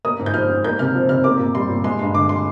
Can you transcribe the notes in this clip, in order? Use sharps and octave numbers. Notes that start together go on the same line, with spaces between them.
A#3 D#6
G#2
G6
F3 F6
G#2
A#3 G6
C3 F6
F3
C3 F6
A#3 D6
A#2
G3 C6
A#2
G#3 C6
G2 C6
D3 D6
C6